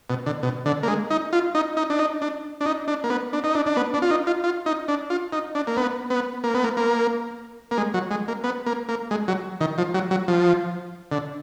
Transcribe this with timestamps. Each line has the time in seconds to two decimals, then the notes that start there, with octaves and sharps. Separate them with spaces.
0.10 B2
0.26 D3
0.43 B2
0.66 D3
0.83 A#3
0.87 G#3
1.10 D#4
1.33 F4
1.55 D#4
1.77 D#4
1.90 D4
1.99 D#4
2.22 D4
2.61 D4
2.66 D#4
2.88 D4
3.04 A#3
3.10 B3
3.33 D4
3.44 D#4
3.55 D4
3.66 D4
3.77 B3
3.94 D4
4.02 F4
4.11 D#4
4.27 F4
4.44 F4
4.66 D#4
4.88 D4
5.10 F4
5.33 D#4
5.55 D4
5.67 A#3
5.77 B3
6.10 B3
6.44 A#3
6.54 B3
6.64 A#3
6.77 A#3
7.71 A#3
7.77 G#3
7.94 F#3
8.11 G#3
8.28 A#3
8.44 B3
8.66 A#3
8.89 A#3
9.11 G#3
9.28 F#3
9.61 D#3
9.78 F3
9.94 F#3
10.11 F#3
10.28 F3
11.12 D3